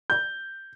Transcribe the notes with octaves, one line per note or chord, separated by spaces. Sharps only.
G6